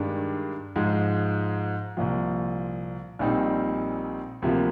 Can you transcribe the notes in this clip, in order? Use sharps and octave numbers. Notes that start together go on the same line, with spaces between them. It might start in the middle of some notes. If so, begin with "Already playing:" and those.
Already playing: G2 D#3 G#3 D4
G#2 F3 G#3
C2 A#2 F3
A#1 A#2 G3 C4 D#4
D2 C3 F3 A#3 F4